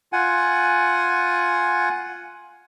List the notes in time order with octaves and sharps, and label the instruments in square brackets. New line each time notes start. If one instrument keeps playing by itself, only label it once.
[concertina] F4 F#5 G#5